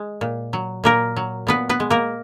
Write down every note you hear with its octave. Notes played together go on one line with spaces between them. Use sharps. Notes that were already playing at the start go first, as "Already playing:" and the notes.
Already playing: G#3
A#2
F#3
A#2 A#3 A#4
F#3
A#2 B3 B4
B3 B4
G#3
A#3 A#4